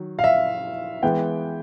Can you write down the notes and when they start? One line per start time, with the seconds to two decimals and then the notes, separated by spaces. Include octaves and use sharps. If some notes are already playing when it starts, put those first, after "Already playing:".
Already playing: D#3 F#3
0.19 F5
0.24 E5
1.03 E3 G#3 B3 G5